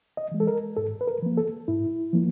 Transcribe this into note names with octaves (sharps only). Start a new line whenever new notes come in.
D#5
E3 G#3
A4
A#4
G#2 A4
B4
A#4
F3 A#3
A4
G#2 E4
F3 A#3